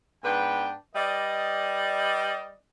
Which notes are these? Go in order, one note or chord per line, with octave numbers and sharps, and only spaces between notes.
G#2 B3 D4 B4 G5
G3 B4 D5 D#5